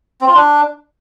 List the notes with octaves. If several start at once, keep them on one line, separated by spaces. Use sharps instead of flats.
C4
F4
D4